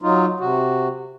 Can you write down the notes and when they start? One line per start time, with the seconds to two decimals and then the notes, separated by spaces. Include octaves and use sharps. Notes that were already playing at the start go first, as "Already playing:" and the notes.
0.02 F#3 D#4 F4
0.40 C3 F#4